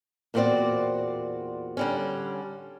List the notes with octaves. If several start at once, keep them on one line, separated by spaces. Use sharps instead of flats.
E2 A#2 B3 C4 F#4 D5
D3 G3 C#4